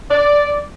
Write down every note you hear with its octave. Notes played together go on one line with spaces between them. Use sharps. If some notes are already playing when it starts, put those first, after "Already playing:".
D5